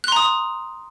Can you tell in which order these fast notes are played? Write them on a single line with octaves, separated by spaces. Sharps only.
F#6 C6 A#5 D#6